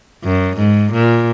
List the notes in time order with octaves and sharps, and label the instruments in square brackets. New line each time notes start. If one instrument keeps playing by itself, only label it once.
[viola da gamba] F#2
G#2
A#2